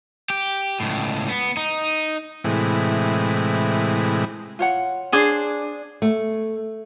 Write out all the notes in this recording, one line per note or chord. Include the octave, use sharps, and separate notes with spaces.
G4
C#2 A2
B3
D#4
A2 C3 E3 G#3
F4 C#5 F#5
D4 G#4 C5
A3